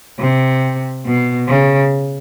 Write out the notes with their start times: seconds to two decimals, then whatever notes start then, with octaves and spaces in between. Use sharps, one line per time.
0.19 C3
1.05 B2
1.48 C#3